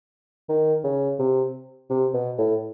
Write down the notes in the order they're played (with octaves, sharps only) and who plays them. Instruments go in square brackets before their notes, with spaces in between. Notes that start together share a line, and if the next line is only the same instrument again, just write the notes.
[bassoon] D#3
C#3
C3
C3
B2
A2